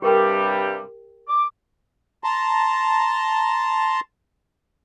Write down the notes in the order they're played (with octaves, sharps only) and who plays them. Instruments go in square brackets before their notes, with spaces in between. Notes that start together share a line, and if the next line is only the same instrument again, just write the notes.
[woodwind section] G2 C3 G3 [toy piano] G4 A#4 G5
[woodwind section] D6
[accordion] A5 A#5 C6